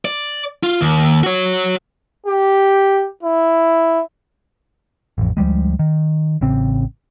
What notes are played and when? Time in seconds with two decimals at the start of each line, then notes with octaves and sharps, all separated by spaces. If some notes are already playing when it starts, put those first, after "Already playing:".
0.05 D5
0.63 F4
0.81 D#2
1.23 F#4 C#5
2.26 G4
3.23 E4
5.18 A1 F2
5.37 D2 F3 G3 G#3
5.79 D#3
6.41 A1 C#3 C4